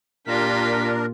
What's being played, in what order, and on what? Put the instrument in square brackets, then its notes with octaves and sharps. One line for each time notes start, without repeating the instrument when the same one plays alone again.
[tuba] A#2 [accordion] D4 A#4 [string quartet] F4 [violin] G4 B6